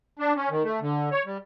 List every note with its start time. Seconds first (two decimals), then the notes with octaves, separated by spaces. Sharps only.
0.19 D4
0.36 C#4
0.50 D#3
0.63 A3
0.81 D3
1.12 C#5
1.26 G3